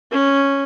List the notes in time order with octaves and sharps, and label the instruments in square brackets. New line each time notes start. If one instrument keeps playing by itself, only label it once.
[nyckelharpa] C#4